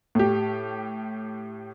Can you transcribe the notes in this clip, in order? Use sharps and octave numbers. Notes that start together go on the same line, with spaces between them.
A2 G4